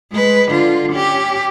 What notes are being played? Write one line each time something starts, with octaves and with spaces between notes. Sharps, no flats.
G#3 B4
D3 F4
C#4 G4